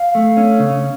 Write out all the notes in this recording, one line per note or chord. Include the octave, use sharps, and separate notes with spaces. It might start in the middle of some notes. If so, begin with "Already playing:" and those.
Already playing: F5
A3
C#4
C#3